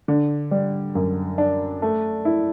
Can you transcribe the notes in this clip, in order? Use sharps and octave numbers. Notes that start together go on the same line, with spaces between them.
D3
G3
F#2
D4
A3
E4